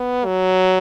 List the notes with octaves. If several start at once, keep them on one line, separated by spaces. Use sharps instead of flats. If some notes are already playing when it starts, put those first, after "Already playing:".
Already playing: B3
F#3